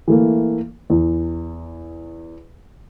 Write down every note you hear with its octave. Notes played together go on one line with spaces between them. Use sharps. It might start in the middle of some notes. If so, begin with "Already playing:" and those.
E3 A3 A#3
E2